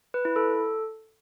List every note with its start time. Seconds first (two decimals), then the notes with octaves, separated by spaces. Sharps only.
0.14 B4
0.25 E4
0.36 A4